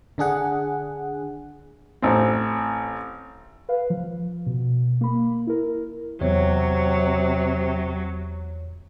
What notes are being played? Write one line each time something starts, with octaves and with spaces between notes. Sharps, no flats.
D3 D4 G#4 F#5
A1 C4
B4 F5
F3
B2
A#3 B5
E4 A#4
E2 C3 F#3 C#5